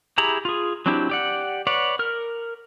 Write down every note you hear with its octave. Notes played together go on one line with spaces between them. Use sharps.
E4 G4 G#4 A#5 B5
F4 G#4
F#3 C4 D4 E4 G4
G4 D5 F#5
B4 C#5 D5 F#5
A#4 F6